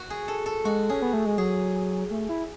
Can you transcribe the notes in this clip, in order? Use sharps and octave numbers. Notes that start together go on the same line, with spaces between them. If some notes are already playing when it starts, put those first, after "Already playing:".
Already playing: F#4
G#4
A4
A4
G#3 F#4
C#4 G#4
B3
A3
G#3
F#3 G#4
A3
E4